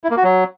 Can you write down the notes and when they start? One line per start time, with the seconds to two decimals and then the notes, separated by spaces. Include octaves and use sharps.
0.04 E4
0.10 A#3
0.17 F#4
0.24 F#3